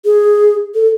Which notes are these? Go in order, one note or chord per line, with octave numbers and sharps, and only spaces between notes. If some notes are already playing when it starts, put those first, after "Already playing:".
G#4
A4